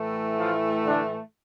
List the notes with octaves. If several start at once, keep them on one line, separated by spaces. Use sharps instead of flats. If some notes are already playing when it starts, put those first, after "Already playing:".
Already playing: A2 E3 A3
F3 F4
D3 D4